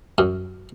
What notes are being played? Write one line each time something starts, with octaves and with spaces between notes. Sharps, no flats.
F#2